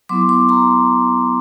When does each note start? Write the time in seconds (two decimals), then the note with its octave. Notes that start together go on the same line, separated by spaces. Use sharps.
0.09 F#3 B3 E4 C6 D6
0.29 C6 D6
0.49 A#5 C6